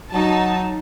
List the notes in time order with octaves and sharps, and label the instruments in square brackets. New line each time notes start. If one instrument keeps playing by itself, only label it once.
[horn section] F#3 [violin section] D#4 A5